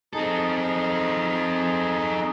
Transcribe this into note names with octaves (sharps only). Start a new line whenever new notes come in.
C4 D#4 G#4 A4